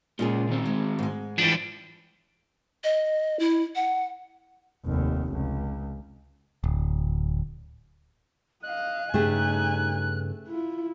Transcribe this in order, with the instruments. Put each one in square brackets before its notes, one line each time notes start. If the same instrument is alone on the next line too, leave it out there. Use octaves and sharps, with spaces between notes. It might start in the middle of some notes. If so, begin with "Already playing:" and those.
[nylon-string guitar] A#2 F4 G#4 [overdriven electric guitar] C#3 G#3
[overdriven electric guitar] D#3 C4
[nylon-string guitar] G#3
G#2 G#3
[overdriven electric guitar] E3 F3 [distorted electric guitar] G3 D4
[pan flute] D#5
E4
F#5
[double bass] F1 D#2
C#2
[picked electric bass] D1
[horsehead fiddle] D#5 F5 [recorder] F#6
[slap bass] G2 C#3 [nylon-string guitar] A3 G4 G#4 [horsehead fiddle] D#4 G#5
[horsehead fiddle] E4 F4